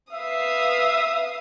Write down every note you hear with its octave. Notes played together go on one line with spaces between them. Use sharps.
B4 E5 F5 D#6